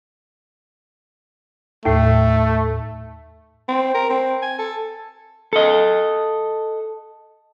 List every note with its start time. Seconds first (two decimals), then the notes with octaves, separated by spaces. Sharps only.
1.85 D#2 A2 A3
3.68 C4
3.94 A#4
4.09 C4
4.42 G#5
4.59 A4
5.53 A4 D#5